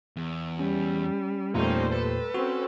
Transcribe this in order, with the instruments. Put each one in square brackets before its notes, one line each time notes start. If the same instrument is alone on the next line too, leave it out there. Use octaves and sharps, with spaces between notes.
[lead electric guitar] E2
[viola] G3 [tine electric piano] C#4
[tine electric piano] E2 A#2 [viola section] G3 A3 C5 [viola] A#3 C#4 [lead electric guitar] D#4
[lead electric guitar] A4 [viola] B4
[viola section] C4 C#4 [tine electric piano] F#4